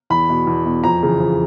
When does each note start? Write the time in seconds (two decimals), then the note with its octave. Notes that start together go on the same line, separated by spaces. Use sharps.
0.10 E2 B5
0.29 B2
0.47 E2
0.65 B2
0.84 F2 A#5
1.03 C#3 E3
1.20 F2